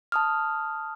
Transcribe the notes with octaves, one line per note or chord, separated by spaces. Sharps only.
A5 D#6 F6